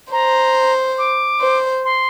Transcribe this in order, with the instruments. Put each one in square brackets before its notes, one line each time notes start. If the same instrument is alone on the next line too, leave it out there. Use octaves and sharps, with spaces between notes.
[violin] C5 [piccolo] A#5
[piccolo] D6
[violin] C5
[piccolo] C6